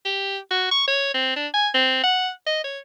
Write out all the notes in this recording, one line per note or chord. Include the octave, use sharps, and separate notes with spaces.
G4
F#4
C#6
C#5
C4
D4
G#5
C4
F#5
D#5
C#5